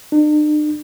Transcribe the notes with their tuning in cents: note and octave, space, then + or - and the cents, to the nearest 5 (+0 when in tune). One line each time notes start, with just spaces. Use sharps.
D4 +45